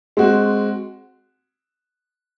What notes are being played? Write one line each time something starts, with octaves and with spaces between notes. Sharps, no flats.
G#3 C4 F#4